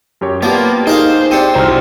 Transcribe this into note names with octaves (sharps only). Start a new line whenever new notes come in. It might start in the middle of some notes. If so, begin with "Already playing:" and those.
F#2 G4 C#5
F3 A#3 B3 G4 D5
D#4 G#4 A#4 C5 F5
C4 D4 G4 C#7 D#7
C2 E4 F#4 C5 A#5 F6